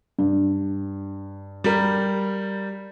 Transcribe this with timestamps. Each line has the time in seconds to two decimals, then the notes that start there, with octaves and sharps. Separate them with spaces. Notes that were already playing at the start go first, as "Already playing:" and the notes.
0.19 G2
1.64 G3 A#4